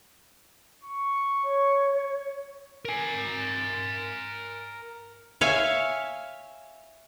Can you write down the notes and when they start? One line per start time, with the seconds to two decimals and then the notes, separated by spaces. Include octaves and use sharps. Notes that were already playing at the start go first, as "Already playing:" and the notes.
0.84 C#6
1.44 C#5
2.85 A#4 G#5
5.41 C#5 E5 F5 G#5